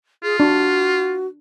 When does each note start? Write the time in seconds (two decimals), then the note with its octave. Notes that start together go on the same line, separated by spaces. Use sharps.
0.23 F4 G#4
0.40 D4 F#4